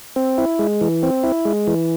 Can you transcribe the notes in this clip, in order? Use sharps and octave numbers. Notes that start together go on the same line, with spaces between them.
C4
E4
G#3
E3
C4
E4
G#3
E3